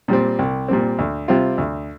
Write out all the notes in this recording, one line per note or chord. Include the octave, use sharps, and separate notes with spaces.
A#2 G3 C4
C2
A#2 G3 C4
D2
C3 G3 C4 F4
D2